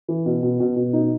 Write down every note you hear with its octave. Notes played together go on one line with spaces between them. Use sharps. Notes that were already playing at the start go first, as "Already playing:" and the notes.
E3
B2
B2
B2
B2
B2 D#4